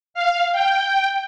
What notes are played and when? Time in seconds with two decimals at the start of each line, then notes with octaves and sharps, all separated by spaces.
0.14 F5
0.52 G5